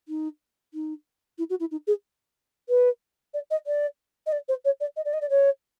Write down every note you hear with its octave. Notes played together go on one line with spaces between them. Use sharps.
D#4
D#4
E4
F#4
E4
D#4
G#4
B4
D5
D#5
D5
D#5
D5
C5
C#5
D5
D#5
D5
D#5
D5
C#5